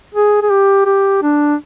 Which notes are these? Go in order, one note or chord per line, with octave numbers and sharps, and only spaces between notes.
G#4
G#4
G4
G4
D4